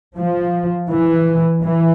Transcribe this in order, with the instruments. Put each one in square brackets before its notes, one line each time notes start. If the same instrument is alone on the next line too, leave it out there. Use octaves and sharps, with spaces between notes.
[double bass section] F3
E3
E3